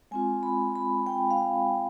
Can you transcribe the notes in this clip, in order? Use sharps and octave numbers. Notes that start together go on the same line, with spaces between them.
G#3 C4 F4 G#5
B5
B5
G5
F5